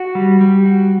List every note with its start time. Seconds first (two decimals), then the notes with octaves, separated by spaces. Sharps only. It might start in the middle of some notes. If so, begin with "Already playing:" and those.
Already playing: F#4
0.15 G3
0.41 G3
0.66 F#4